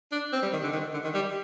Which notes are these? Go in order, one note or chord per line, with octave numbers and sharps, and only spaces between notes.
D4
C4
G3
D#3
D3
D#3
D3
D#3
G3